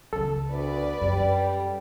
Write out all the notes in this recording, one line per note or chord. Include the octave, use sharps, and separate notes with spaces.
C#2 B3 A4
D2 B4 D5
F#2 G3